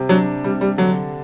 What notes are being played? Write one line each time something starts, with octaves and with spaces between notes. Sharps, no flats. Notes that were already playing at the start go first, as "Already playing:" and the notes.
Already playing: C3 G3
F#3 D4
C3 G3
G3
D3 F#3